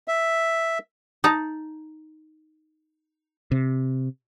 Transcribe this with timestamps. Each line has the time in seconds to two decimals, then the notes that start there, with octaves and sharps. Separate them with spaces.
0.08 E5
1.24 D#4 A5 A#5
3.51 C3